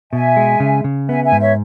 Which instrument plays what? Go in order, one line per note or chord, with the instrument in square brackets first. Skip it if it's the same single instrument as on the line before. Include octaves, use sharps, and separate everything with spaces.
[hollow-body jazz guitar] B2 [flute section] E5 G#5
[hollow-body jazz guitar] G#3
C#3
C#3
[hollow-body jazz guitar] B3 [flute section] E5 G#5
[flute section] E5 G#5
[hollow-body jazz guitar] G#2
[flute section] C#5 E5